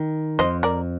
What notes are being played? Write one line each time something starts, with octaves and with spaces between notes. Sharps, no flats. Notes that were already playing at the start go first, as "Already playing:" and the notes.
Already playing: D#3
F2 C5 D#5
A#4 D5